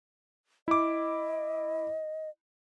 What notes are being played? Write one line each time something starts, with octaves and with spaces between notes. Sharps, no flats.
E4 D#5 D6